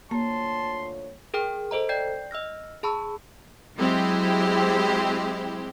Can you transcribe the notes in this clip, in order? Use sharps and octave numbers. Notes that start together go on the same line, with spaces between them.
D2 A#3 F4 C#5 A5 C6
G#4 A#4 G5 F6
A4 C5 D#5 A#5
D5 G5 G6 G#6 C7
D#5 E6 F6 A#6
G#4 A5 B5 C#6 E6
F#3 G#3 C4 E4 G4 C5